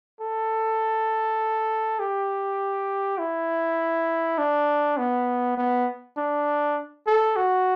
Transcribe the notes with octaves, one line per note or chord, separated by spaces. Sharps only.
A4
G4
E4
D4
B3
B3
D4
A4
F#4